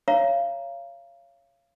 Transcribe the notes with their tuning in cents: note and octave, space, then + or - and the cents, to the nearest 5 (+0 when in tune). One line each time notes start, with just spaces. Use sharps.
C#5 +0 F5 -30 A#5 +0